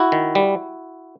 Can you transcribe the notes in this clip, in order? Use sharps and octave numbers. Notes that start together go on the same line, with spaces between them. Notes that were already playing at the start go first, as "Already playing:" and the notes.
Already playing: E4 F#4
D#3
G3